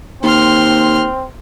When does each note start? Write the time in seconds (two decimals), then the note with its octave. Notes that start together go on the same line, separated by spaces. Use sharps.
0.23 D#2 C4 C6 F6